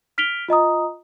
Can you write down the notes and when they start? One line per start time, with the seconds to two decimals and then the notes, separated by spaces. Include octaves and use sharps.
0.18 F6 B6 D7 F7 G7
0.48 F4 D#5 A#5 D#6